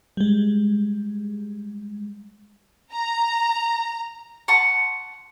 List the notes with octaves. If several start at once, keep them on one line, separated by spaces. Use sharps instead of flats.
G3 G#3
A#5
F#5 A5 C6 C#6